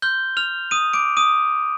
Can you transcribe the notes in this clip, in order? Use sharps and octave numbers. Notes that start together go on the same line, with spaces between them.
C6 F6 G6 G7
F6 F7
D#6 D#7
D6 D7
D#6 D#7